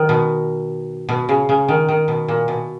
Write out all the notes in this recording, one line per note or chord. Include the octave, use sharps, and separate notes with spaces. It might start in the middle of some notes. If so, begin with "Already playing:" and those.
Already playing: D#3
B2
B2
C#3
C#3
D#3
D#3
B2
A#2
B2